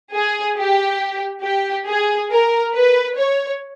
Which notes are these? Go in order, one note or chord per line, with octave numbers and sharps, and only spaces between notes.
G#4
G4
G4
G#4
A#4
B4
C#5